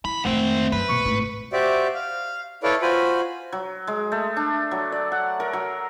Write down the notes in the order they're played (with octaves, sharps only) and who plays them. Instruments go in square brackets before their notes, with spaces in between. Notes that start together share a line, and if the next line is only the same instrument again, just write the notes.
[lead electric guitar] B1 B5 [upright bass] E4
[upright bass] F2 D#3 [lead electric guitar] G#2 C4 [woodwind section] A3
[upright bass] F#2 [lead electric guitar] B4
[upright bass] B1 A#2 [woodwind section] C#6
[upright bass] G#1 A2
[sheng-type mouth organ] F#4 G4 C5 D5 E5
F5
E4 A4 B4 C#5 D5 F5
F4 F#4 C5 G#5 B5
[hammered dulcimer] F#3
G#3
A3
D4
F#3
D5
F#5
A#4
F#3